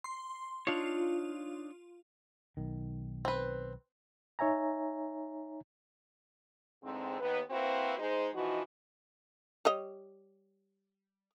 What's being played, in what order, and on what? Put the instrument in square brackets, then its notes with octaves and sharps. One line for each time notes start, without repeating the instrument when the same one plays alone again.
[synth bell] C6
[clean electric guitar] D4 D#4 C#5 [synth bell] F4
[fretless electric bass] B1 D#3
[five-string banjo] C4 B4
[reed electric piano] D#4 C#5 E5 G#5 A#5
[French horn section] E2 G#2 D3 C4
D#2 B3 B4
A#3 C4 E4 F#4 B4 C5
G#3 D#4 C5
B2 E3 F3 D#4 F#4
[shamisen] G3 C#5 D#5